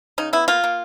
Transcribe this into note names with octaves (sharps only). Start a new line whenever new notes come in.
C#3 D#4
B3 E4
A#3 F4
A#3